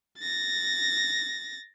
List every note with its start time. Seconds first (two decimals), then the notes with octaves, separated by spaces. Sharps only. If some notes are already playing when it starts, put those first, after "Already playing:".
0.19 A6 A#6